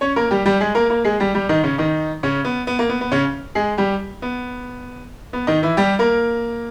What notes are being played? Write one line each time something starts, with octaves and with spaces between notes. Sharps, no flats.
C#4 C#5
A#3 A#4
G3 G4
G3 G4
G#3 G#4
A#3 A#4
A#3 A#4
G#3 G#4
G3 G4
G3 G4
D#3 D#4
C#3 C#4
D#3 D#4
C#3 C#4
B3
B3
A#3
B3
B3
C#3 C#4
G#3 G#4
G3 G4
B3
B3
D#3 D#4
E3 E4
G3 G4
A#3 A#4